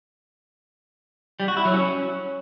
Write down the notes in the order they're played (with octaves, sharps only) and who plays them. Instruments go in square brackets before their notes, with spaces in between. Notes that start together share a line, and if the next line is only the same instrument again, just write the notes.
[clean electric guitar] G3
F#4
E4
F#3
C#4